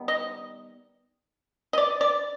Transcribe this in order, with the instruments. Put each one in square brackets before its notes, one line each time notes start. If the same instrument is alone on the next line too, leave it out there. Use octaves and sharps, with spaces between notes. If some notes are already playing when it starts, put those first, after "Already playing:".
Already playing: [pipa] D#3 G3 B3
D#5
D#5
D5
D5